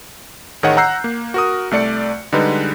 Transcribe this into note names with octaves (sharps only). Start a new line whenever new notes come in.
A1 D#3 G#4 C#5 D#5 F#5
F#5 A#5 E6 F#6 G6 C7
A#3
F#4 A#4 D#6
C2 A3 D5 C#7
D3 G3 G#3 D#4 B4